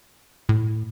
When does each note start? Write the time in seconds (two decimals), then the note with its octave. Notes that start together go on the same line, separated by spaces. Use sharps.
0.49 A2